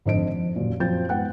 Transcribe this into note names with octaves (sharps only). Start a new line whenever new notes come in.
G#1 F2 D3 D4 D#5 D7
F2
D#1 F#2 A#2
F#2 F3 C4 G6 A6
G#2 B3 F#5 G5 F#6